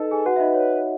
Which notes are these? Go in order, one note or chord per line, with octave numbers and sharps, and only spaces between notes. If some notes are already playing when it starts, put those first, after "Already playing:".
Already playing: D#4 A4 B4 D#5
G#4 G#5
F#4 B4 F#5
E5
D#4 D#5
C#5